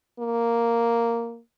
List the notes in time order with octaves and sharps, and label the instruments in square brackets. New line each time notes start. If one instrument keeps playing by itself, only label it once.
[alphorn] A#3